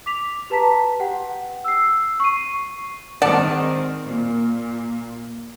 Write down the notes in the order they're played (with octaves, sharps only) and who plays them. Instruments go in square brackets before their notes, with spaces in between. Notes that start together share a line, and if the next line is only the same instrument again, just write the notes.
[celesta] D6 B6 F7
G4 B4 A5 A#5 B6
G4 F#5 G5
E6 C7
C#6 C7 D#7
[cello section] D#3 G#3 C4 [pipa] D5 F#5 A5
[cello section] A#2